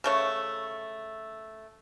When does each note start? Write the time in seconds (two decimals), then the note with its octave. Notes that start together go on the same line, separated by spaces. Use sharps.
0.04 C#3 A3 C#5